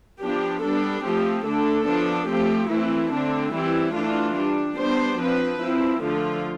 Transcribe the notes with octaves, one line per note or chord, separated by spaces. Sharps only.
F3 B3 D4 G4
G3 B3 D4 A4
F3 A3 C4 G4
D3 A3 D4 A4
F3 B3 D4
F3 A3 C4 G4
E3 A3 C4 E4
D3 A3 C4 D4
E3 G3 C4 E4
E3 A3 D4 F4
G3 D4
G3 B3 D4 C5
F3 C4 B4
F3 C4 E4
D3 F3 A3 F4